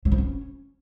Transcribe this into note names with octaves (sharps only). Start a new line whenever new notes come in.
F#3
F3
C#4